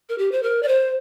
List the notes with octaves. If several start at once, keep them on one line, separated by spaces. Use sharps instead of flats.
A#4
G4
C5
A#4
D5
C5